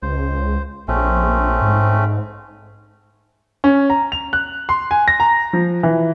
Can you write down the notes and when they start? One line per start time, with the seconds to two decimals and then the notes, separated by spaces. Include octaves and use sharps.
0.02 C#2 C5
0.88 A#1 A3 C4 C#4
1.62 G#2
3.64 C#4
3.90 A#5
4.12 F7
4.33 F#6
4.69 C6
4.91 G#5
5.08 A#6
5.20 A#5
5.53 F3
5.83 E3